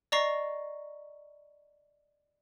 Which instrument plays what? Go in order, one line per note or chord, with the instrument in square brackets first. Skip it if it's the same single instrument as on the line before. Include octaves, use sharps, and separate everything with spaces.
[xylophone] D5 D#5 A#5 C#6 A#6 C7